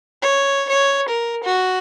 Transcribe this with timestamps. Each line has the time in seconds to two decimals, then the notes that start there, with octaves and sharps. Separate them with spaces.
0.24 C#5
0.70 C#5
1.10 A#4
1.45 F#4